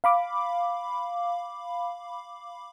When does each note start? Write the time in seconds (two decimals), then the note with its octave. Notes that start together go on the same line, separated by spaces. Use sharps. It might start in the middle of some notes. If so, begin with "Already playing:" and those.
0.04 F5 B5 D6